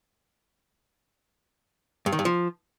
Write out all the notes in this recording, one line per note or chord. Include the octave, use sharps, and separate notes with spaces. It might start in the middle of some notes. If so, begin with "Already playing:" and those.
G2
D#3
G2
F3